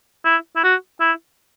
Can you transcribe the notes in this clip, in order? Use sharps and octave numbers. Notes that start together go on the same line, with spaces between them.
E4
E4
F#4
E4